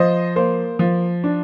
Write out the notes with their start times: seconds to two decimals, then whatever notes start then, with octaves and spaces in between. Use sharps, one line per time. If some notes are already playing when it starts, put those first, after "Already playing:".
Already playing: F3 C5 D#5
0.36 A#3 C5
0.79 F3
1.24 D4